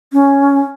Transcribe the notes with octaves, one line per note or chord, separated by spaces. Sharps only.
C#4